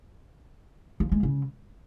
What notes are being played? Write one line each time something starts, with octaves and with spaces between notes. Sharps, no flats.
F3
G#3
C#3